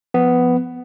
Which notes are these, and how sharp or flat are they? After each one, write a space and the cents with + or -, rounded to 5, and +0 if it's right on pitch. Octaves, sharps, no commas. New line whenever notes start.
F3 +0 B3 +10